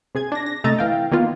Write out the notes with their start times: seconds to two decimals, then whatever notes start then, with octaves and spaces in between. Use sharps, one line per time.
0.15 C3 G#4 G#6
0.32 D4 A#6
0.46 A#6
0.64 C3 A3 D#5 E5 A#5 A6
0.79 E3 F5 G5
1.11 D#3 A#3 B3 F4